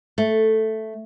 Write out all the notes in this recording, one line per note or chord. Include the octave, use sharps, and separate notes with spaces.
A3